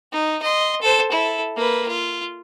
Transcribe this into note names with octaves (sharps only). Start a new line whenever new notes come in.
D#4
D#5 C6
A4 C5
E4 A4
A#3 B4
F4